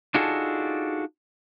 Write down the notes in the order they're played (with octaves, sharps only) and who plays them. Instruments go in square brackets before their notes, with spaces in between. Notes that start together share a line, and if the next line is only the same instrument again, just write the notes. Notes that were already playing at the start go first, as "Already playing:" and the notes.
[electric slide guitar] D4 D#4 F4 F#4 G#4 A4